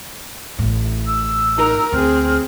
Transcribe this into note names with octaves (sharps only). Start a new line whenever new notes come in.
A1 A2
E6
D#4 A#4
D2 C4 G#4 F6